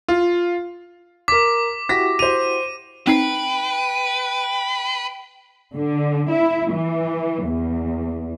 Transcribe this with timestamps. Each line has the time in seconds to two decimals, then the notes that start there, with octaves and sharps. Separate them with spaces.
0.09 F4
1.28 A#4 D6 B6
1.89 E4 F#4 G4 A#6 B6
2.19 C5 D#7 F7
3.07 C4 D#4 B4 G5 C7
5.74 D3
6.29 E4
6.72 E3
7.45 E2